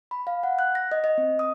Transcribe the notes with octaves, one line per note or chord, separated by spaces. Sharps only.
B5
F5
F#5
F#6
A#6
D#5
D#5
C4
D#6